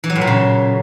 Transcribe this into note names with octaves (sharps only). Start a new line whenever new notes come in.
E3
F#3
A2
A#2
C#3